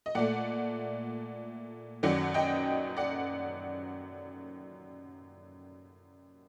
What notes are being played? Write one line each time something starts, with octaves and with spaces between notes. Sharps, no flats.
D#5
A#2 A3 D5 F#5
F#2 D#3 F#3 D5 F#5
D#5 G5
D5 F#5